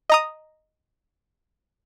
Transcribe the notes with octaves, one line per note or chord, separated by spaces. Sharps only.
D#5 A#5 D#6